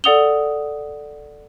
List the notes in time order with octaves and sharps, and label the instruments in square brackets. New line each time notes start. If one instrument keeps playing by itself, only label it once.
[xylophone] A4 D5 F#5 D#6 F7 G7